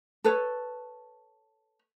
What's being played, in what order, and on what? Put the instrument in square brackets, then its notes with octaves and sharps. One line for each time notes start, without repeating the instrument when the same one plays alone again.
[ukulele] A4 B4 C#5